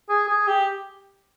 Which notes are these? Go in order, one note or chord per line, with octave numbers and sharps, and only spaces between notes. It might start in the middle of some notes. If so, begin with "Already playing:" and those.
G#4
G#4
G4